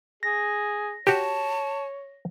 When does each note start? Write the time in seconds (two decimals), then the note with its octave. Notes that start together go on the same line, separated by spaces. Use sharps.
0.23 G#4 A#6
1.07 F#4 G4 C#5 A5